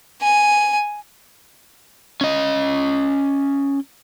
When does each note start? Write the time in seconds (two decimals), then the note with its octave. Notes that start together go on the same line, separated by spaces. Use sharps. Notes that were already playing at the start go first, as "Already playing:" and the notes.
0.21 G#5
2.21 C#4 D#5